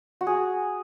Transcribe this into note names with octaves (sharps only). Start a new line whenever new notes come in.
F#4
G#4